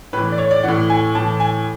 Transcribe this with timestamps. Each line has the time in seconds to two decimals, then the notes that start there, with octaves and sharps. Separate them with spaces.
0.13 A2 E3 B4
0.32 D5
0.38 C#5
0.51 D5
0.63 A2 E3 F#5
0.90 G#5
1.15 A2 E3 A5
1.40 G#5